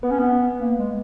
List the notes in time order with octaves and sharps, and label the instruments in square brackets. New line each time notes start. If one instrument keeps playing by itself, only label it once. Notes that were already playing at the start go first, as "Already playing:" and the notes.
[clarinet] B3 [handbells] B4
[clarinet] C#4
B3
A#3
G#3